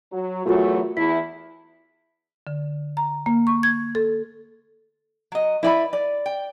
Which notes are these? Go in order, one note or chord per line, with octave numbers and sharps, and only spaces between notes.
F#3
E2 F#3 A3 F4 F#4 A#4
E2 E4 B6
D3
A#5
A#3
C#6
G#6
A4
F#3 D#5
E4 B4 D5 B5
D5
G5